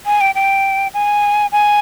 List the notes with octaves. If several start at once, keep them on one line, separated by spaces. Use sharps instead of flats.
G#5
G5
G5
G#5
G#5